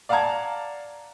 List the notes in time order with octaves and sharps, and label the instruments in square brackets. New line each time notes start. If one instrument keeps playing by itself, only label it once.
[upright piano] D5 F5 F#5 A5 A#5 G#6